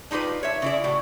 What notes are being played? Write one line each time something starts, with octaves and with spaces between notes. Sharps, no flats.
D4 D#4 F4 G4 B4
C#5 E5
C#3 E4 D5
A2 F#4